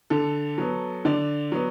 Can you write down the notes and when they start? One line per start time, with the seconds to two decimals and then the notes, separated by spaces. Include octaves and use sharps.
0.10 D3 A4
0.58 F#3 B3
1.05 D3 D5
1.52 F#3 B3